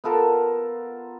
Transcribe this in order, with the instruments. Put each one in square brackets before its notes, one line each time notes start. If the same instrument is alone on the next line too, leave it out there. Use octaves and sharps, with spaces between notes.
[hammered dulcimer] B3 F4 A4 A#4